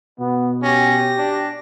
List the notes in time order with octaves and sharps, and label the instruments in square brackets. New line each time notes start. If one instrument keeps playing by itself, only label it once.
[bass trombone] B2 [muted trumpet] B3
[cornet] C#4 [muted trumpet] G4 [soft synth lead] A#6
[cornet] D4